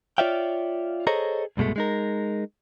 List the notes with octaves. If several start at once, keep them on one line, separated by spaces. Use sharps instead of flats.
F4 C#5 D5 E5 F5 G5
G#4 A4 C5 C#5 D#5 A#5
C2 G2 B2 G#3 A3
G#3 D#4 A#4